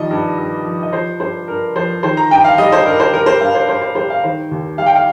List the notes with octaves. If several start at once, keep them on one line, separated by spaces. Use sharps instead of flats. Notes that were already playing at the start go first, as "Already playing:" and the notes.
Already playing: D#3 F3 G3 D#5
G2
G2
F3
D#5
F3 C5
G2 C5
G2 A#4
F3 C5
D#3 C5
A#5
G2 G5
F5
G3 D#5
C5
G2 A#4
C5
G3 A#4
C5
G2 F5
C5
G2 C5
C5
G3 C5
F5
D#3 C5
D#2
G3 F5
G5
F5